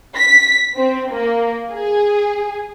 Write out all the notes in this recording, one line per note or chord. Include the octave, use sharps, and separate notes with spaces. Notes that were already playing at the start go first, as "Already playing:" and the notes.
B6
C4
A#3
G#4